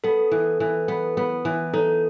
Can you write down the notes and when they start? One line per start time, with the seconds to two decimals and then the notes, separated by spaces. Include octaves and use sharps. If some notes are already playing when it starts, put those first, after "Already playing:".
0.04 B3 A4
0.31 E3
0.60 E3
0.88 B3
1.17 B3
1.45 E3
1.73 D#4 A4